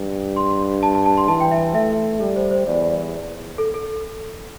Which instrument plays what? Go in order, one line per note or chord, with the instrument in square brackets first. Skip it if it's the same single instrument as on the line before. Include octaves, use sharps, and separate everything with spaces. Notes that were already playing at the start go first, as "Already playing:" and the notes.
Already playing: [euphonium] G2
[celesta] C6
A5
A5
A5
C6
[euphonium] E3 [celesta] A5
[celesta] G5
E5
E5
[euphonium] A3 [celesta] E5
[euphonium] G3 [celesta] A4
[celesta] C5
C5
[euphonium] E2 [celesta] D5
[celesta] A4
A4